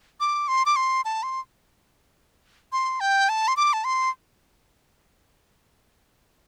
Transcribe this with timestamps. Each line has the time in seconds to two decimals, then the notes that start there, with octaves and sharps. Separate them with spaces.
0.20 D6
0.48 C6
0.66 D6
0.76 C6
1.05 A5
1.23 C6
2.72 C6
3.00 G5
3.29 A5
3.48 C6
3.57 D6
3.73 A5
3.84 C6